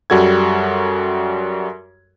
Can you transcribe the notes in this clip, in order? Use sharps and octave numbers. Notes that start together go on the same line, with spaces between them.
F#2 G3 F#4 A4 G#6